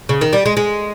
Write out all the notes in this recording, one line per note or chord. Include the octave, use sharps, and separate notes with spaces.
C#3
D#3
G3
G#3
G#3